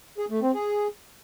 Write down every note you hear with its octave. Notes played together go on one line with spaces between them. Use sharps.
G#4
A3
C4
G#4